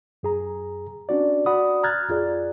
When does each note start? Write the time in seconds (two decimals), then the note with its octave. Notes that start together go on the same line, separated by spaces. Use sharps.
0.23 F#2 G#4 A#5
1.09 C#4 D4 F#4 D5
1.46 F#4 D5 F#5 B5 D#6
1.83 A#5 F6 F#6 G#6 A6
2.09 F2 F4 G#4 D5